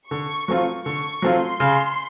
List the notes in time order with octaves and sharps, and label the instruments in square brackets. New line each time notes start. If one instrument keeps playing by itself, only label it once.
[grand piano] D3 [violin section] C#6
[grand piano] F#3 A3 C4 F4
[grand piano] D3 [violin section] C#6
[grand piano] F#3 A3 C4 F4 [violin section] C6
[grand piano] C#3